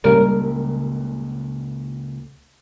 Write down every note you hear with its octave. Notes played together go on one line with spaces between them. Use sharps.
C#2 A#2 C#3 G3 A#3 A#4